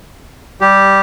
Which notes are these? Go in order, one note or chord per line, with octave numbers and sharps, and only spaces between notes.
G3 G4